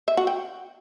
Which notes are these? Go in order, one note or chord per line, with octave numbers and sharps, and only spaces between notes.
E5
F#4
G5